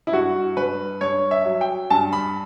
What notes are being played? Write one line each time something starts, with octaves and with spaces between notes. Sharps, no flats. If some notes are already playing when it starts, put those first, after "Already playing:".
E4
G2 F#4
G2 B4
G2 C#5
E5
F#3
G5
G2 A5
B5